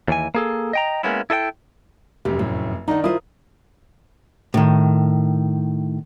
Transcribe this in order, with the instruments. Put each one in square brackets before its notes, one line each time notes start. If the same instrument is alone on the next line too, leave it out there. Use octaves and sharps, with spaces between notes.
[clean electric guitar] D#2 E3 G#5
A#3 G#4 A4
D#5 G5 A#5
G#3 A#3 B3 C#4 E4
E4 A4 D#5 G5
[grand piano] F1 F#2 [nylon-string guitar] G4
[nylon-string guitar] A2
[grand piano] D#3 D4 D#5 [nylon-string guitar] D#4 F#5
[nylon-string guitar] E4 F4 C5 [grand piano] A#4 D#6
[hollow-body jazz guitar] A2 D#3